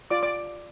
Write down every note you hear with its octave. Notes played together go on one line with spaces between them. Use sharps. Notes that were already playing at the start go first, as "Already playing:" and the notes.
F4 D5 D6
D5 D6